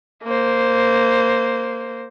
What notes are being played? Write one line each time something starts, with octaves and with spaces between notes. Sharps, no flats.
A#3 C5